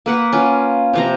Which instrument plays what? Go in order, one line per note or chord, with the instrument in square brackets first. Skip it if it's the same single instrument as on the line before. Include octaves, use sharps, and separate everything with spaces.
[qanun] A#3 B4 F#5
C#4 F4
C3 F3 A#5